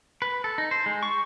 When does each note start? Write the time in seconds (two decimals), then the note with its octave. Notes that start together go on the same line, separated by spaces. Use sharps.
0.22 B4
0.44 A4
0.58 D#4
0.71 C5
0.86 G#3
1.03 C#6